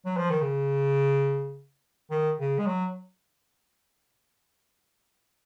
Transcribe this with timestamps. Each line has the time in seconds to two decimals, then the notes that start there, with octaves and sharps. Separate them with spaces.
0.06 F#3
0.17 F3
0.30 D#3
0.42 C#3
2.11 D#3
2.39 C#3
2.59 G#3
2.67 F#3